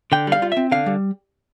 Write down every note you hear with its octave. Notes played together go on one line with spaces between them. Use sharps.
D3 G5
G3 F5
F4
E5
C4
D3 F5
G3